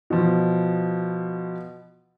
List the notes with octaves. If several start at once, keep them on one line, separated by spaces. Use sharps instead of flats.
B2 F3